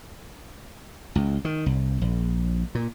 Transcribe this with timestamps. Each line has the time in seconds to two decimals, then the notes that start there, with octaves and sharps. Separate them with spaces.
1.16 C#2
1.45 D#3
1.66 C2
2.02 A#1
2.75 A#2